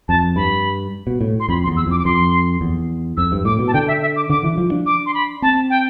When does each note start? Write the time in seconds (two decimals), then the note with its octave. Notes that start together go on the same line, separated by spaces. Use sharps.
0.09 F2 A5
0.36 G2 B5
1.07 B2
1.21 A2
1.40 C6
1.49 F2 B5
1.63 C6
1.68 E2
1.77 E6
1.87 F2 D6
1.99 D6
2.05 F2 C6
2.61 E2
3.17 F2 E6
3.32 G2
3.45 A2 D6
3.59 B2
3.68 A5
3.74 D3 G5
3.88 E5
4.01 E5
4.16 D6
4.30 D3 D6
4.44 E3
4.58 F3
4.72 D4
4.86 D6
5.06 C6
5.14 B5
5.42 C4 A5
5.70 G5